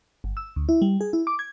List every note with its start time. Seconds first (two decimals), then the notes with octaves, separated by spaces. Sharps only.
0.24 G1
0.37 E6
0.56 D2
0.69 E4
0.82 G3
1.01 G#4
1.13 E4
1.27 D6
1.39 G#6